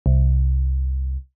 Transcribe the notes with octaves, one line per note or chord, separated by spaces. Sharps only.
C2